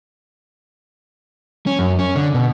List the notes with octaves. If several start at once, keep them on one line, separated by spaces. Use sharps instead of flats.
C#4
F#2
C#4
D3
B2